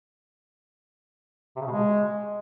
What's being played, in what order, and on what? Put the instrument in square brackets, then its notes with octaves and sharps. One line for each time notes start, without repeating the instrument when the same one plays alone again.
[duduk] C3
C#3
B2
G#3